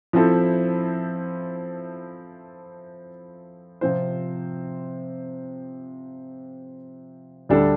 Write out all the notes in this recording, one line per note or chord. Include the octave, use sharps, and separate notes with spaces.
F3 C4 E4 A4
C3 F3 C4 F4 C5
D2 D3 G3 D4 A4